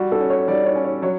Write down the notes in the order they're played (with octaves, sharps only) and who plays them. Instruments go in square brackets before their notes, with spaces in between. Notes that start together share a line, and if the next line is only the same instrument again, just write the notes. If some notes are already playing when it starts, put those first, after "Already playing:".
Already playing: [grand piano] G3 [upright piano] F#4
[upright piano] A4
[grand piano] C#4
[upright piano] C#5
[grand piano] G3 [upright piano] D5
[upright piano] C#5
[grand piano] C#4
[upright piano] C#5
[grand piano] F#3 [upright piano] C#5